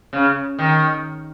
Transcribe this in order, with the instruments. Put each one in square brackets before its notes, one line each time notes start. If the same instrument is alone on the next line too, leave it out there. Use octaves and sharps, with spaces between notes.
[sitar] C#3
D#3